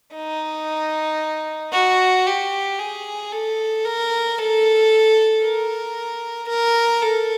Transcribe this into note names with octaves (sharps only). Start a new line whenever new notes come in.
D#4
F#4
G4
G#4
A4
A#4
A4
A#4
A#4
A4